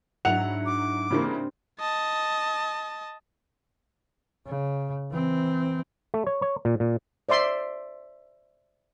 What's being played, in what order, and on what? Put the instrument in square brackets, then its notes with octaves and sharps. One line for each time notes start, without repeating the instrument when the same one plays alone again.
[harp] G#2 D4 [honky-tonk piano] F#3 E4 F7 [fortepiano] F#5
[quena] D6
[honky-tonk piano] C#3 E3 A#3 [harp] C4 D4 G4
[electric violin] D#5 A5
[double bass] C#3
E3 C4
[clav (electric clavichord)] A3
C#5
C#5
A#2
A#2
[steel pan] C5 D5 E5 C6